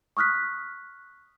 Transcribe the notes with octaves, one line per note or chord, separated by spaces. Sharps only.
C#6 D#6 F6 F#6 B6